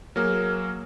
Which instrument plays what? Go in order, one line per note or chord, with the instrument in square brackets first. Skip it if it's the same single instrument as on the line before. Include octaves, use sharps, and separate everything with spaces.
[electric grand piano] F#3 A#3 G#4 [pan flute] F6